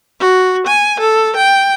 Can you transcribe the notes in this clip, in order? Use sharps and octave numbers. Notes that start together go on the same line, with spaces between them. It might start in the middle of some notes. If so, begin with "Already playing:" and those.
F#4
G#5
A4
G5